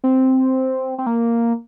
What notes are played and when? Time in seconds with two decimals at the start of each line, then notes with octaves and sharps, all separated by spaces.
0.04 C4
0.98 C4
1.06 A#3